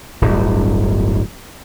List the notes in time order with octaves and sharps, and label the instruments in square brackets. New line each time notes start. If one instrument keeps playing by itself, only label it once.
[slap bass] D1 G1 G2